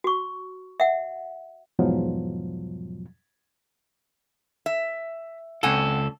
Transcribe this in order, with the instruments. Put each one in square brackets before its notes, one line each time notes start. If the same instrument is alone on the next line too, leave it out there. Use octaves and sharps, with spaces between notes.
[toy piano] F#4 C#6
E5 F#5
[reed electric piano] E2 G#2 B2 F3 F#3
[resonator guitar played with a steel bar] E5
[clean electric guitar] C#2 A4 [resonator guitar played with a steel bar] C4 F#5 G#5